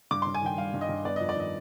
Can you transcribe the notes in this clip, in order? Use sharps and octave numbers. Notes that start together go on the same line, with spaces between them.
G2 D6
G2 C6
G#5
D#3 G5
G3 F5
G2
D#5
G2
B3 D5
F2 D#5
D5
D#3 D#5